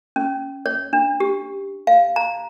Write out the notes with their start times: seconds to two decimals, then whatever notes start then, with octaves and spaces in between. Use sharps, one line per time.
0.16 C#4
0.66 C#5
0.93 D4
1.20 G4
1.87 F5
2.16 A#5